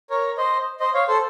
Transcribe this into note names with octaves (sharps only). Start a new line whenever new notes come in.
A#4 C#5
C5 D#5
C5 D#5
C#5 F5
A4 C5